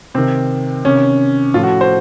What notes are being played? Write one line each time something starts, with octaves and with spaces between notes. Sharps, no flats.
C3 D#3 C4
C3 D#3 C#4
A2 F3 F4
F#4
C5